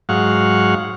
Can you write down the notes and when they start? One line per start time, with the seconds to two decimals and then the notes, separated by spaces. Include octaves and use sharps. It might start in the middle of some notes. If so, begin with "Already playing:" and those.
0.09 G#2 F#3 F5 F#5 C#6